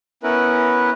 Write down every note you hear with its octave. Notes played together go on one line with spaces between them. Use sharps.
B3 C#4 E4 A#4 B4